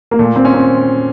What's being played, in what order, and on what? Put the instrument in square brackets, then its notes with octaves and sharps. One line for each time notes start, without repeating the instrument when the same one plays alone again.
[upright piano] A#3
[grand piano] A#2 [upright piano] A3
[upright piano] C4
[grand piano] C#4
[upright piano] C4